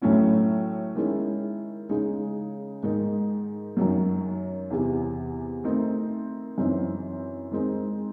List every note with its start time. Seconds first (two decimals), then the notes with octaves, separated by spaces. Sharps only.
0.02 A2 F#3 A3 C#4 E4
0.96 D#3 G#3 C#4 E4
1.89 C#3 G#3 D#4
2.83 G#2 D#3 G#3 D#4
3.77 F#2 D#3 F#3
4.71 E2 C3 E3
5.64 D#3 A3 C4 D#4
6.58 F#2 E3 C4 D#4
7.51 D#3 G#3 C4 D#4